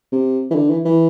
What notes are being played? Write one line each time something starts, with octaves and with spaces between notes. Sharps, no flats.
C3
E3
D3
E3
E3